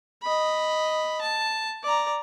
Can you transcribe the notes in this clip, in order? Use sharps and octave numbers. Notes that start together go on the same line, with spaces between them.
D#5 B5
A5
D5 A#5